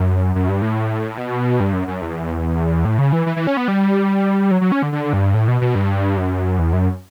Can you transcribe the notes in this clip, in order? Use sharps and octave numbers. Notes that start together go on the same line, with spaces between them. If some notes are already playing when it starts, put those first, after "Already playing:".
Already playing: F#2
F#2
G2
A2
B2
G2
F#2
F#2
E2
A2
C#3
E3
E3
E3
C#4
B3
G3
F#3
F#3
C#4
D3
D3
G2
A2
B2
B2
G2
F#2
E2
F#2